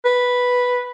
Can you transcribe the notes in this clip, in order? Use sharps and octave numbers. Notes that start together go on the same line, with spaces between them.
B4